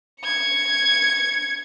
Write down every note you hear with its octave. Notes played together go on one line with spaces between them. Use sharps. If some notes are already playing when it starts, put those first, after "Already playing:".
G#6 C#7